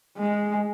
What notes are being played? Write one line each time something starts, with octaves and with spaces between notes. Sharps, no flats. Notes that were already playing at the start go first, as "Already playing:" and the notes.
G#3